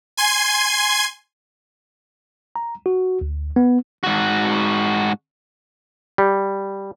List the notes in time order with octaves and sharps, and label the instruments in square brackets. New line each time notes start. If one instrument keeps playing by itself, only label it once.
[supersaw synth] G#5 C6 G#6
[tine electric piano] A#5
F#4
D2
B3
[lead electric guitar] G#2 F#4
[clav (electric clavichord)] G3